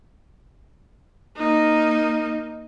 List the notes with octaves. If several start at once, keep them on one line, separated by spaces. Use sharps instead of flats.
A#3 D#4